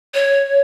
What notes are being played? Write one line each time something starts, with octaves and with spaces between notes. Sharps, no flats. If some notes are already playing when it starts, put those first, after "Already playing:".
C#5